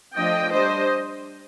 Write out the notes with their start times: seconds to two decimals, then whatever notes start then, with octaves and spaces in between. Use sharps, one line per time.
0.16 F3 A3 D4 D#5 G5
0.52 G3 D4 C5 D#5